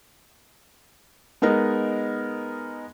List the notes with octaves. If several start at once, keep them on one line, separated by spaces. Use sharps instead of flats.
G#3 B3 D#4 A#4